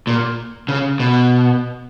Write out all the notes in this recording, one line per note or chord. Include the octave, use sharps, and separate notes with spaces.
A#2
C#3
B2